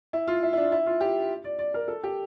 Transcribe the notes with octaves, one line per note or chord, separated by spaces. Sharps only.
E4
F4
E4
E4
D4
E4
F4
G4
D5
D5
A#4
A4
G4